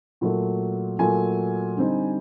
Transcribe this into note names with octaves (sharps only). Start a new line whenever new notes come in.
A#2 F#3 A3
A#2 F#3 A3 G#5
D3 G3 C4 D#4